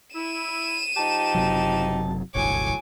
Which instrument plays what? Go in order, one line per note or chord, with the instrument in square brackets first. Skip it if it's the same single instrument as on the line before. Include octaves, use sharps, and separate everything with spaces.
[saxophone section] E4 [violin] D#7 E7
[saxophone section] F3 D#4 G4 [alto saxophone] A5
[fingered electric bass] F#1 C3 F#3
[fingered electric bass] D1 G1 C2 [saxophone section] A2 F#3 C#5 [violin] G#5 D6